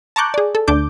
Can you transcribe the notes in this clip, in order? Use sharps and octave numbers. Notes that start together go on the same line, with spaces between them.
A5 A#5 C#6 D6 F#6 G6
G#4 D5
A4
D2 D4 D6 G6